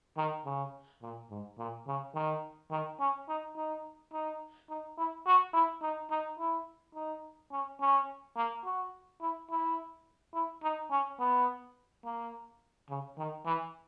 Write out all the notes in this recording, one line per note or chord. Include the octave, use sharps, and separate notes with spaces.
D#3
C#3
A#2
G#2
A#2
C#3
D#3
D#3
C#4
D#4
D#4
D#4
D#4
E4
F#4
E4
D#4
D#4
E4
D#4
C#4
C#4
A#3
F#4
E4
E4
E4
D#4
C#4
B3
A#3
C#3
D#3
E3